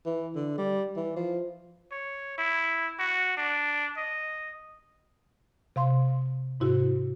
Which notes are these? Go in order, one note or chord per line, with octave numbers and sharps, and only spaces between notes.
E3
D3
G3
E3
F3
C#5
E4
F#4
D4
D#5
C3 F5 C6
G#2 C3 E4 F#4